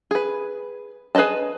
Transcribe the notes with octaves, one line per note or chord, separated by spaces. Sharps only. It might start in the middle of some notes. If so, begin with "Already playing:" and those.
G#4 B4
G#4 B4 D5 D#5 A5